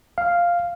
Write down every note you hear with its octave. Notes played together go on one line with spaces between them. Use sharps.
F5